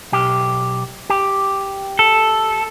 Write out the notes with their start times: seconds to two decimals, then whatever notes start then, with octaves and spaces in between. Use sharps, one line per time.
0.12 B1 G4
1.10 G4
1.99 A4